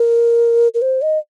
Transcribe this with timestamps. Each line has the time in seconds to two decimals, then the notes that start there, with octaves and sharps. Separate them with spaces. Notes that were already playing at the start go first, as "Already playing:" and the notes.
Already playing: A#4
0.74 A#4
0.82 C5
1.02 D#5